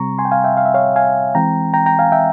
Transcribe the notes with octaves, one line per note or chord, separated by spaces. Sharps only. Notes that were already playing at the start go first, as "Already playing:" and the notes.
Already playing: C3 G3 C4 A#5 C#6
G#5 C6
G5
F5 G#5
E5 G5
F5
E5
C#5 F5
F5 G#5
E3 G#3 C4 G5 A#5
G5 A#5
G5 A#5
F5 G#5
E5 G5